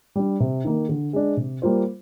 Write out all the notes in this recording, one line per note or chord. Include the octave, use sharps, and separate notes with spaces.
G3 D4
C3
D#3 A#3
D3
G#3 D4
C3
G3 A#3 F4 C5